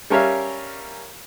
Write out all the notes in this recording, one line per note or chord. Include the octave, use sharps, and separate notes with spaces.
G3 C#4 A#4 C#5 E5 F5